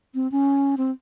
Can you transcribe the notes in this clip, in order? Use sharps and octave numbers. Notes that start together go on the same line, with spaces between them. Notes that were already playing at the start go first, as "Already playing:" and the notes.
C4
C#4
C4